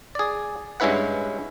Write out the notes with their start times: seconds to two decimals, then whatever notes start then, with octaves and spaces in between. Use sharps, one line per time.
0.15 G#4 D5
0.80 G2 G#3 C#4 E4 B4 F#5